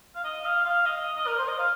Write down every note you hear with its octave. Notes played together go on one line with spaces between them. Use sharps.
F5
D#5
F5
F5
D#5
D#5
A#4
C5
D#5
F5